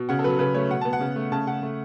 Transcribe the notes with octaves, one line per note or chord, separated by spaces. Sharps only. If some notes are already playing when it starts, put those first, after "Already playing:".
Already playing: B2
C#3 F#5
A4
F#3 B4
C#3 B4
A3 C#5
B2 F#5
B3 A5
F#5
C#3
A3
C#3 A5
C#3 F#5
A3